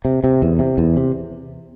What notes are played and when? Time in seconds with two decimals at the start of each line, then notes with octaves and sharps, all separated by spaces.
0.05 C3
0.24 C3
0.42 E2
0.59 C3
0.78 E2
0.97 C3